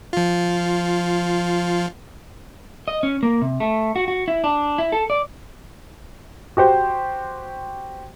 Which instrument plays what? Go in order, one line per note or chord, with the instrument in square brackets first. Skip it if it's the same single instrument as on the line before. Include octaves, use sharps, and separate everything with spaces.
[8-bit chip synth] F3 F4
[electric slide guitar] D#5
C#4
A#3
C3
A3
F#4
F#4
E4
D4
E4
A4
D5
[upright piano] F#4 G4 C5